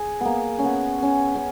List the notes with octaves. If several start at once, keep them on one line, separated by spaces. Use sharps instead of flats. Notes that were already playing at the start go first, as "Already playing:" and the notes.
Already playing: G#4
A#3 B3
C#4
B3
C#4
C#4